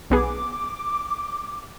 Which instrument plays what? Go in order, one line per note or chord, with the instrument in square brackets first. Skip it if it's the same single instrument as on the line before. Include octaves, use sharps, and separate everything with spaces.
[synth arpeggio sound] B1 B3 G#4 [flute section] D6